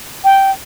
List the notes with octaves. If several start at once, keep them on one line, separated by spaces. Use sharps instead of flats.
G5